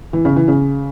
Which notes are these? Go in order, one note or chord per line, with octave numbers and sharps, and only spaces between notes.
E3
C#3
E3
C#3